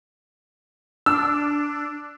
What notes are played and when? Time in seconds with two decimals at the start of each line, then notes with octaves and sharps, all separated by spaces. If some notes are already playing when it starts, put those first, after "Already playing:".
1.06 D4 E6